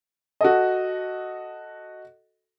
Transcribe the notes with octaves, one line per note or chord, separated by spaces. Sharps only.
F#4 A4 D#5